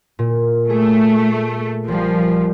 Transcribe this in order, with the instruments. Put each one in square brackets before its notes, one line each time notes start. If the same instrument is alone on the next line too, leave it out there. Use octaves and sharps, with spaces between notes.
[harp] A#2
[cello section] A3 [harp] G#4
[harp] A#1 G3 [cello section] F3